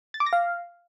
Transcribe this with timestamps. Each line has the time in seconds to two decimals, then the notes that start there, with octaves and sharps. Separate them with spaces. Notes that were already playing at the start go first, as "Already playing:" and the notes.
0.14 A6
0.20 D6
0.26 A#6
0.33 F5